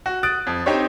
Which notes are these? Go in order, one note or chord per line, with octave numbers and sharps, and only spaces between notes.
F#4
D#6 F#6 A6 D7
F2
C4 D#4 G4 C5 C#5